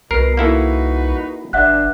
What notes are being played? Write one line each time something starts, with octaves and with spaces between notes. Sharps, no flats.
C2 B2 A#4 C7
A#3 D#4 E4 F#4 A4 B4
G1 G2 D4 E5 F#5 F#6